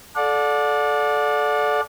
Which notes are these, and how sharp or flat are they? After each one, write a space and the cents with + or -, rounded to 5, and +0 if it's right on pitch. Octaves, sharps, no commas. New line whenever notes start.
A4 -20 D5 +0 F#5 -40